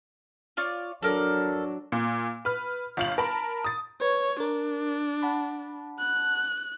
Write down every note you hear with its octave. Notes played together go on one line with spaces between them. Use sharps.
F4 C#5 D5
F#3 D4 A4 A#4 D5
A#2
B4 F6
G1 F4 F#7
A#4 A5 B5
D#6 A6
B4 C#5 C#6 G#6
D4 A#4
F#5 A5 B5
F#6